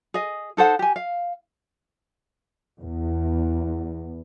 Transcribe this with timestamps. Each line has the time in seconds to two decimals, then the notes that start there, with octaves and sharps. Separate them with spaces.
0.14 G#4 D#5
0.57 D#4 A4 C5 F#5
0.79 G4 G#5
0.96 F5
2.80 E2